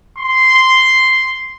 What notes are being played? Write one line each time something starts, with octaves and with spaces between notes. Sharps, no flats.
C6